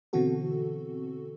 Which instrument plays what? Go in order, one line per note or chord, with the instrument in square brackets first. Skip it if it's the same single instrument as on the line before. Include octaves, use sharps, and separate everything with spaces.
[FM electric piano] B2 D3 E3 C4 F#4 A4